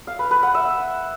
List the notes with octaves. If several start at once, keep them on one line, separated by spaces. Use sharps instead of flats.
F5
B4
B4
F#5
E5